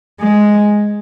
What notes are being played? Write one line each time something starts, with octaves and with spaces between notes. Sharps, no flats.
G#3